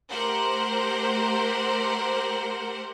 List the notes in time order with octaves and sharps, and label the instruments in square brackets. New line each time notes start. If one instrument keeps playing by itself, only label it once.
[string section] A3 G4 A#4 C5 F#5